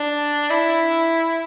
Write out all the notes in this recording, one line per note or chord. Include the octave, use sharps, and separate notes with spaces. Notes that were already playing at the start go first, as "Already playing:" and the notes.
Already playing: D4
E4